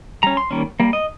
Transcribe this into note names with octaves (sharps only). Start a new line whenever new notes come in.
G3 C#4 A#5
C6
D#3 G3 A#3 C#4
G3 A#3
D#5